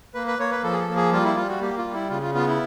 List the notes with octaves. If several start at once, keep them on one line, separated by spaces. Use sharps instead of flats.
A#3 B4
B4
A#3 C#5
B4
F3 A4
G#4
A4
A#3
G#4
G3 F4
E4
G3 F4
F#4
A#3 G4
F4
G3
E4
C#3 F4
F4
B3 F4
E4